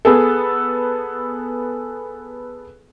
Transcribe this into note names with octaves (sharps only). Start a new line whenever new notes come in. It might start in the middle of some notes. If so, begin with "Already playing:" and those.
B3 G#4 A4